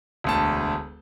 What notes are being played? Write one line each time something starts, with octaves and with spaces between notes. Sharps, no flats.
E1 D2 A5